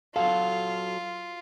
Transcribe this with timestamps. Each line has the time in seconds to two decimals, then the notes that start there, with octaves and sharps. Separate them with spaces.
0.16 F#3 F4 F#4 A4 F5